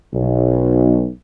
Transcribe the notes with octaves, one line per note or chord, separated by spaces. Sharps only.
B1